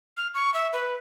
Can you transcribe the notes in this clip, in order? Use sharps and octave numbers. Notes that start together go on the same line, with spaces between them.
F6
C#6
E5
B4